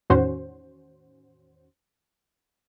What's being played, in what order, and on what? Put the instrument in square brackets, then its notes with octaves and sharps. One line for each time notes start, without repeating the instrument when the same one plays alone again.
[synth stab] E2 A2 D#3 C#4 F#4 C5